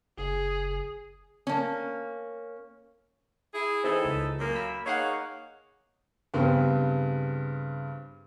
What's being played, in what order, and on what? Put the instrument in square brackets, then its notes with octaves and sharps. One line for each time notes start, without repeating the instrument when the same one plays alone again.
[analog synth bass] F#1 [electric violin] G#4
[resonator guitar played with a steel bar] A#3 C#4
[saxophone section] E4 G#4
[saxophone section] E3 D#4 A4 [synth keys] C4 E4 G#4
[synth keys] C#2
[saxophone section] F#2 A#3
[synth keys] B5 E6
[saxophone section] A#3 D#4 G#4 [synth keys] C#5 F5 F#5
[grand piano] G2 C#3 B3 C4